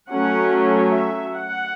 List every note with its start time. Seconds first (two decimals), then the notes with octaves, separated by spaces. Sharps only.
0.11 F#3 A3 C#4 F#5
0.94 E5
1.35 F#5